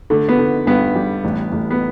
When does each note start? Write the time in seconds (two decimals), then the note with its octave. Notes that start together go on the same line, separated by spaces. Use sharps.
0.10 D3 A3
0.29 B3
0.38 D3
0.67 G2 B3
0.95 G3
1.24 A1
1.52 A1
1.71 B3